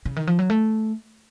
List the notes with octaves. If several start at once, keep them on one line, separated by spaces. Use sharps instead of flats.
C#3
D#3
F3
F#3
A3